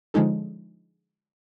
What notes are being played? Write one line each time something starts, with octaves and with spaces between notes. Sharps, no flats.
D3 F3 G#3 C#4 D#4 A4